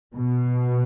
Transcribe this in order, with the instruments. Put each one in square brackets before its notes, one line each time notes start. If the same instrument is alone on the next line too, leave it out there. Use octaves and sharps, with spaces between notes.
[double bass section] B2